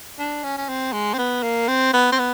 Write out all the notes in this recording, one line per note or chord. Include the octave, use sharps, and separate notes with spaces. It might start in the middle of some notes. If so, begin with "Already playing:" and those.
D4
C#4
C#4
C4
G#3
C4
B3
A#3
C4
B3
C4
B3